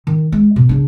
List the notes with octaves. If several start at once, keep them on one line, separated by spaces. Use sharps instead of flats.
D#3
G#3
B2
C#3 D4